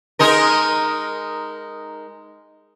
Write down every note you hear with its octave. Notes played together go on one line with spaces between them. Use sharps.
G#3 D#4 A#4